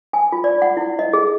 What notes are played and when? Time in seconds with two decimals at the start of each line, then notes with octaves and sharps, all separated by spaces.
0.13 G#5
0.32 F4
0.44 D5
0.62 F#5
0.77 E4
0.99 D#5
1.13 G#4